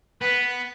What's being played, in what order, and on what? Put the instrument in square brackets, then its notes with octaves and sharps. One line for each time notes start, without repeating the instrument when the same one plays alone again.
[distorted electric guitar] B3 [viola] B4